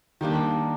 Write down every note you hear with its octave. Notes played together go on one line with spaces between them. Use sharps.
D#3 G3 A#3 D4 G4